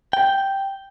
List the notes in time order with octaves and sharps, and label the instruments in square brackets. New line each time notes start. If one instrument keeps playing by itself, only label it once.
[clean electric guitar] G5